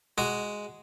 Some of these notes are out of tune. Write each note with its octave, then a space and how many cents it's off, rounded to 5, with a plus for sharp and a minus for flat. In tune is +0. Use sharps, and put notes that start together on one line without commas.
G#3 +0 F#4 +0